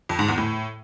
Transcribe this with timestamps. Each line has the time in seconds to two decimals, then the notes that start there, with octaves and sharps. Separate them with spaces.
0.09 F2
0.19 G#2
0.28 E2
0.38 A2